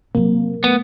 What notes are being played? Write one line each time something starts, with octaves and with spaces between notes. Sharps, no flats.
C3 F#3 A#3
A3 B3